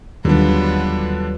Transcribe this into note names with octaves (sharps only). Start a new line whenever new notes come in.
D#2 D3 F#3 G3 B3 D4 F4